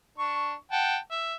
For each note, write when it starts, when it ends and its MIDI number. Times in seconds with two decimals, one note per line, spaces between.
0.18 0.54 62
0.18 0.54 85
0.72 0.97 78
0.72 0.97 79
0.72 0.97 81
1.11 1.34 76